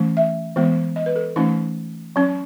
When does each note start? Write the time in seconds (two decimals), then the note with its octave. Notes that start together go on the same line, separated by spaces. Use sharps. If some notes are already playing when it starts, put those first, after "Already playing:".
Already playing: E3 A3 C#4
0.17 E5
0.56 E3 G#3 B3
0.96 D#5
1.06 B4
1.16 A4
1.36 E3 A3 C#4 D#4
2.16 F#3 C#4